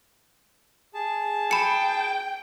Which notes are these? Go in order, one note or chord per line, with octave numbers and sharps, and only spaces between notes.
G#4 A5
G5 B5 C#7